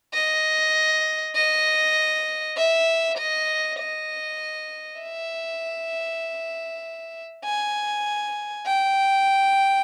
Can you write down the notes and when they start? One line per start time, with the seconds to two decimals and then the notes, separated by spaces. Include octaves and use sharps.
0.14 D#5
1.35 D#5
2.57 E5
3.18 D#5
3.79 D#5
5.01 E5
7.45 G#5
8.67 G5